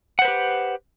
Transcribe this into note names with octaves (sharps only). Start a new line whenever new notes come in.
G4 B4 C5 F#5